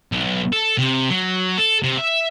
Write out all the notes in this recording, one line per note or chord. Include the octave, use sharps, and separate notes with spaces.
B1
A4
C3
F#3
A4
C3
E5